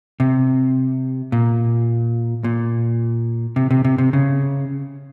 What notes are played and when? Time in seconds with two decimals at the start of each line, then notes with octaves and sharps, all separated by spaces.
0.20 C3
1.32 A#2
2.44 A#2
3.56 C3
3.71 C3
3.84 C3
3.98 C3
4.13 C#3